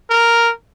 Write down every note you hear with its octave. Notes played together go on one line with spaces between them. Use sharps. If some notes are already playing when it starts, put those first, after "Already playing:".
A#4